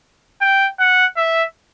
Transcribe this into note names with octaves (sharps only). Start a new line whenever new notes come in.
G5
F#5
E5